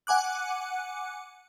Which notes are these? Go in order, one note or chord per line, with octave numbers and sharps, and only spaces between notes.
F#5 G#5 D6 F#6